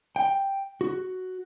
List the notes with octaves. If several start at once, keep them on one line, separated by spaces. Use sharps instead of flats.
G5
F#4